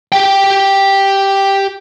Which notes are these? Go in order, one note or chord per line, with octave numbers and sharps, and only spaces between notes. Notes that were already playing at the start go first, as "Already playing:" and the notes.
G4 G5